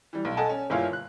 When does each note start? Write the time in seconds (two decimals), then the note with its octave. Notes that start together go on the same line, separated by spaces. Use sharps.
0.13 E3 G3
0.25 B1
0.37 A4 D#5 F#5 G#5 A5
0.49 C#4
0.70 G1 A#2 E4 G#4 C#5 F5
0.93 F#6